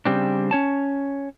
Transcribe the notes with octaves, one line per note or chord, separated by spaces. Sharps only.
C#3 G3 C4 D4
C#4 C#5 A5